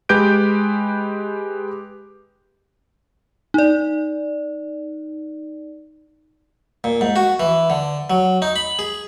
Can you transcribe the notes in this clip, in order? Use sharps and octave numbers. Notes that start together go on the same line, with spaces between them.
G#3 G4 B4 G6 D7
D#4 D5
A#2
G#2
F#4
E3
D3
F#3
D#4
B5
G#4